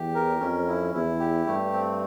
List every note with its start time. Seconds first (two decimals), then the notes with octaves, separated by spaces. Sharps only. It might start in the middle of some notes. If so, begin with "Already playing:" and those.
Already playing: E2 G4
0.15 A#4
0.40 F2 C#4
0.67 E4
0.94 E2 E4
1.20 G4
1.47 G2 A3
1.72 C4